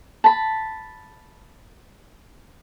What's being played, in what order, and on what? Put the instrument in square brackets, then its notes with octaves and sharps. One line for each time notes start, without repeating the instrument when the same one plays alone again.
[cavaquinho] A5 B5